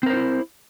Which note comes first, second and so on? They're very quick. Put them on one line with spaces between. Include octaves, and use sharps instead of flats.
C4 A#4 C5 D#4 E4